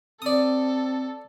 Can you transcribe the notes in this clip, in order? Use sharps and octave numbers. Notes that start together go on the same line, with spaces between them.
C4 A4 D5 D#6